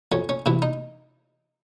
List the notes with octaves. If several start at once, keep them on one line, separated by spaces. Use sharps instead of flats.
F2 C#4
C#4
C3 E3 E4
D#4